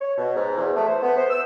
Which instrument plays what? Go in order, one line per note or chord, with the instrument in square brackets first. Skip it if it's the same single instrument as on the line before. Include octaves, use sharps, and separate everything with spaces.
[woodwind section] C#5
B2
G#2
E2
A3
C5
B3
C5
E6